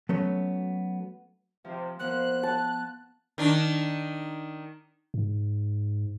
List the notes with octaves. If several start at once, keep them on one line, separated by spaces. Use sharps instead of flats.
F#3 A3 B3 C#4
C3 F3
A1 F3 A#3 B3 C5 F#6
A5
D#3 D4
G#2